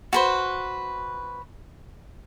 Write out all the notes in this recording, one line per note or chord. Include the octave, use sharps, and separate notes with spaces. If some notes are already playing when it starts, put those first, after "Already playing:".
F#4 B4 C5